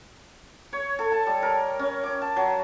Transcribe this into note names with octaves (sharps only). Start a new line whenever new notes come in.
C#5
A4
A5
G3
A#4
C#4
D6
A5
F#3